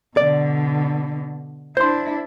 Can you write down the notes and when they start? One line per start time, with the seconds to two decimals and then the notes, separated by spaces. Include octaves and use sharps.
0.17 B2 D3 D5
1.77 D4 E4 C5 C6